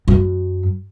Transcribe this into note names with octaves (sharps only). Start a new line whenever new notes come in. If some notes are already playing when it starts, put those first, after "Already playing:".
F#2